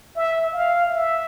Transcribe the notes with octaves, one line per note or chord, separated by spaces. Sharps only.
E5
F5
E5